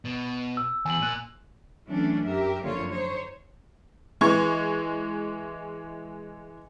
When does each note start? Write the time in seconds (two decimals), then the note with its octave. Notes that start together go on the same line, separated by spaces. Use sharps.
0.05 B2
0.57 E6
0.86 E2 G#5 F#7
1.01 A#2 E6 F#6
1.86 E3 F#3 A3 C#4 D4
2.23 F#2 G4 A#4 E5
2.63 F#2 D3 F3 A#3 F4 C#5
2.92 D#4 C5 C#5
4.21 E3 G#3 C#6 G#6